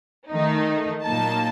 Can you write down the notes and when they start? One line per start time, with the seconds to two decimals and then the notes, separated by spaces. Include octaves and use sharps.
0.31 D#3 A3 D#4
1.04 A#2 F#3 A#3 D#4 A5